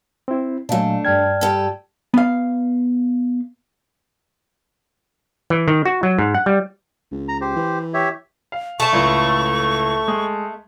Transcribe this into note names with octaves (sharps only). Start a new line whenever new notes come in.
C4 E4
A#2 F#3 A3 D4 D#5 F5 G#5
G2 D5 G5 A5 F6 G#6
G3 A4
B3 F5
E3
D#3
F#4
F#3
G#2
F#5
G3
C#2
A#5
G4 C5
E3
G4 C#5 E5
F5
A3 A5 C#6
C#2 A2
G#3